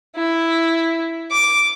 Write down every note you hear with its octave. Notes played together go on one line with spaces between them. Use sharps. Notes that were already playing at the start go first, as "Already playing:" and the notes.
E4
D6